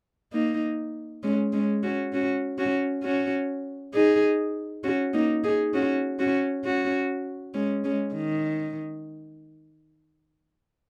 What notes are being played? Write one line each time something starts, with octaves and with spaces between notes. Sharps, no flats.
A#3 D#4
G#3 C#4
G#3 C#4
C#4 F#4
C#4 F#4
C#4 F#4
C#4 F#4
D#4 G#4
C#4 F#4
A#3 D#4
D#4 G#4
C#4 F#4
C#4 F#4
C#4 F#4
G#3 C#4
G#3 C#4
D#3